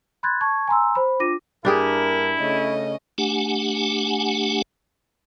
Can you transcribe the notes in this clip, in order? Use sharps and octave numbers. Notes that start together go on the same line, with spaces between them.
B5 C6 F#6 G#6 A6
A5 C#6 G#6
G#5 A#5 C6 E6
C5 B5
D4 F4 D6 A#6 D#7
G2 A#3 D4 E4 G4 G#4 A#4
C#3 A3 C#4 D#5
A3 D4 G4 F#5 G#5